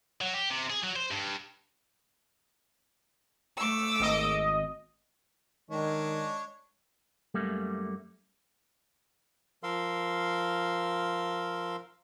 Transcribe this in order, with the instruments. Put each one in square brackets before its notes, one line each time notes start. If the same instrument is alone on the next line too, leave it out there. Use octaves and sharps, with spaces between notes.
[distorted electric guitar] F#3
G4
C3
G#4
F#3
C5
G2
[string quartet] A3 D6 E6
[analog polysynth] G#1 D#5
[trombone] D#3 [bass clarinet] G#3 [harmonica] D4 C#5
[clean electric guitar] F#2 G3 A3 A#3
[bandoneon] F3 A#4 F5 C6 E6